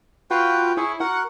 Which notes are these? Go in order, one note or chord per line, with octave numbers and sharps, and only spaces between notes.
F4 F#4 B4 G5
E4 G#4 C#5
F#4 A#4 F#5